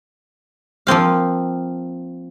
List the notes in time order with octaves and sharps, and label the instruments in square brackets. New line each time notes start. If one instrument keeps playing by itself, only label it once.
[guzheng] F3 A#3 C4 F5